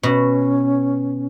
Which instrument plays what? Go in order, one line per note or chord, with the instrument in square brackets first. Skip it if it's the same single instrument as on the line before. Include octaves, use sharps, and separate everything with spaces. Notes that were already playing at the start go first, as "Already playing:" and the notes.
[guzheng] B2 [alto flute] C#4